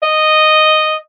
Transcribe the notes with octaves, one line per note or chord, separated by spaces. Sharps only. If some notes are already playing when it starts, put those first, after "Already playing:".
D#5